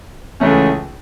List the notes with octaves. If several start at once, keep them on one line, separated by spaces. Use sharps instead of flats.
C#2 C#3 E3 A3 C#4